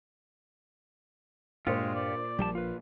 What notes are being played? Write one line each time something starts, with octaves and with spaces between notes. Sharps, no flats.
G2 A#2 G#3 D4 F4 G4 C5 C#5
D5
A#1 F3 G3 G4 A5
F4 B4